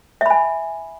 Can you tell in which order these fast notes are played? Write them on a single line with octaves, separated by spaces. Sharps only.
E5 B5 G#5